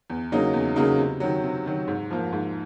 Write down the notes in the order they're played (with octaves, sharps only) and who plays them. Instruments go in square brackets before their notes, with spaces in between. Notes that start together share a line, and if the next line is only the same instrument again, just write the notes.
[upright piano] E2
C#3 F#3 A#3 D#4
E2
C#3 F#3 A#3 D#4
C3
D#3 F#3
C3
D#3 F#3
G#2
F3 A#3
G#2